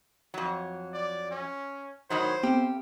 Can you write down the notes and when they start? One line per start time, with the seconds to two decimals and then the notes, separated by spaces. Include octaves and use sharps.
0.34 F2 F#3
0.93 D5
1.31 C#4
2.10 A2 D#3 F#3 C5
2.43 B3 C4 G4